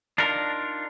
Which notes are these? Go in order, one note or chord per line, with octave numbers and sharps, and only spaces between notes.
D4 D#4 F4 A#4